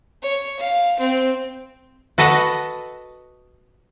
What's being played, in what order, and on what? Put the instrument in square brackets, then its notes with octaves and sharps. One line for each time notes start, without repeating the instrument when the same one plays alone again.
[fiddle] C#5
F5
C4
[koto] F#4 A4 B4 D#5 F#5